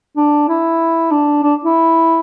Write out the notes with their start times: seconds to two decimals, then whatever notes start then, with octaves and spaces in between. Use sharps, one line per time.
0.17 D4
0.49 E4
1.11 D4
1.43 D4
1.64 E4